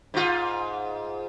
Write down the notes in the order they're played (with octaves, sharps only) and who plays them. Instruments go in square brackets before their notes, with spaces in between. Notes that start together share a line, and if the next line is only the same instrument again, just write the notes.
[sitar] G#2 F4